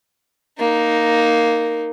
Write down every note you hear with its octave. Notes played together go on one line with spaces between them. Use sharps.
A#3 D#4